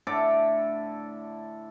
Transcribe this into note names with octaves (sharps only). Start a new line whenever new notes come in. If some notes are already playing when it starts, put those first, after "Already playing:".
A2 D3 A4 D6